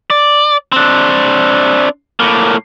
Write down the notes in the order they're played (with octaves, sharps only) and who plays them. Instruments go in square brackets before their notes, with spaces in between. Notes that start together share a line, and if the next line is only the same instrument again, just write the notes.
[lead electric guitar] D5
C4 D4
A2 A#3